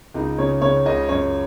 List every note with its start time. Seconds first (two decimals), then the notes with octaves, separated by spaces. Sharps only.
0.14 C#2 D#4
0.38 C#3 C#5
0.62 C#3 C#5
0.86 C#2 D#5
1.09 F#2 C#5